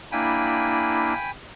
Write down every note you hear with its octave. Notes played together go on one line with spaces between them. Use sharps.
A#3 D4 E4 G5 G#5 B5